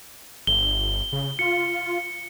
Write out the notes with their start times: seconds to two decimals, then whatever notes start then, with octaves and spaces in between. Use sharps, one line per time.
0.47 G1 G7
1.12 C#3
1.39 F4 C#7